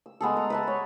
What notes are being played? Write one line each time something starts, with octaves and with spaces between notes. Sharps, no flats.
E6
G#3 B3 G#4 A4
A#5
B4 E5 A5
C#5